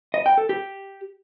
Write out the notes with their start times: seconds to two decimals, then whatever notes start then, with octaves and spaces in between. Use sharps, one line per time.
0.14 D#5
0.26 G5
0.38 A4
0.49 G4